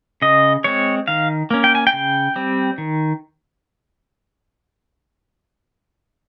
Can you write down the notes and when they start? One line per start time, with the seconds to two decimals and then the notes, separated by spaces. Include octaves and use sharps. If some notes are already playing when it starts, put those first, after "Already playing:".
0.22 C#3 D#5
0.64 G#3 C4 C#5
1.08 D#3 F5
1.51 A#3 C#4
1.64 G5
1.75 G#5
1.87 G5
1.93 C#3
2.36 G3 C4
2.78 D#3